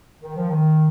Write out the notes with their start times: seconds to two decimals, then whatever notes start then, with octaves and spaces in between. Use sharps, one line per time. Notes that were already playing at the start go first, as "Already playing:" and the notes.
0.22 D#3
0.37 F3
0.50 D#3